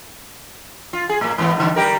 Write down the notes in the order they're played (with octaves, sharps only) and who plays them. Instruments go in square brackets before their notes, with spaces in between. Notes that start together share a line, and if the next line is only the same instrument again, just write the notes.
[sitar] F4
G#4
A2 A#3
G#2 E3 B3
G2 D3
G3 G4 A#4